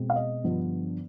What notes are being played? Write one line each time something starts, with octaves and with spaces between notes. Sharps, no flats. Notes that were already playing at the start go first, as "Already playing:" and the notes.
Already playing: B2 G#3 C4
F5
D#5
G2 D3 F3 B3